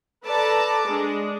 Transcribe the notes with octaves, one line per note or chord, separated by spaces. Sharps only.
A4 B4 D5 A5 A#5 D6
G#3 D4